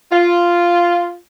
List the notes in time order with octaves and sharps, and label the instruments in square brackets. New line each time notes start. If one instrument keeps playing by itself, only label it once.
[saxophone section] F4